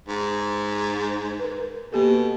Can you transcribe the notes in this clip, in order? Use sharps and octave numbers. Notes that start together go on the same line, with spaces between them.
G#2
A#4 B4
B2 A#3 G4 A4